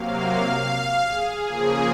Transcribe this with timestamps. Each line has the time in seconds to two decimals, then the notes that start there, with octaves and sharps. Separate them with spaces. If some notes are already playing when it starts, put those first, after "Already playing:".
Already playing: C3 F#3 A#3 F5
1.04 G#4
1.45 C#3 F3 A#3